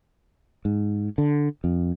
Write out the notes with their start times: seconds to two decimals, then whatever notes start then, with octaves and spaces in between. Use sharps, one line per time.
0.65 G#2
1.18 D3
1.64 F2